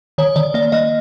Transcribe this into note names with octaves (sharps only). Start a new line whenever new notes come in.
D#3 C#5
D#3 D5
A#3 D5
A#3 D#5